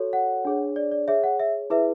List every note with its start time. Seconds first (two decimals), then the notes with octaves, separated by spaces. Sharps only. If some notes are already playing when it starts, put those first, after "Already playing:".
Already playing: F#4 A4 C#5
0.13 F#5
0.45 D4 G#4 C#5
0.76 D5
0.91 D5
1.08 G#4 C#5 E5
1.24 F#5
1.40 E5
1.70 E4 G#4 B4 E5